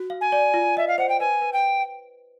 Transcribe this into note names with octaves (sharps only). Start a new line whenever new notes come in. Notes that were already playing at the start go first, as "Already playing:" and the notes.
Already playing: F#4
F5
G#5
D5
F4
D#5 E5
F5
C5 F#5
G5
B4 G#5
B4
G5